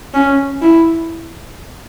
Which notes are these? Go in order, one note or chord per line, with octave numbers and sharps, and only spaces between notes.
C#4
E4